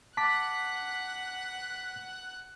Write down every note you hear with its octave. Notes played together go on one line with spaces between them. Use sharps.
F#5 A5 D6 F#6 B6